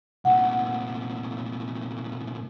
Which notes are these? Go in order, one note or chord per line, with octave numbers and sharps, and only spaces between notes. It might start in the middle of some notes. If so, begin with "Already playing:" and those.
C2 A#2 F#5